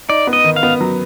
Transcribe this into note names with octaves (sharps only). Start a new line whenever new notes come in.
D#4 D5
B3
D#5
D#3
F5
B3
F#3